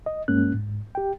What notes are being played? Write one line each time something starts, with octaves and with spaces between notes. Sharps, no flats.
D#5
G2 G#3 A#3 C#4 F#6
G#2
G4 G5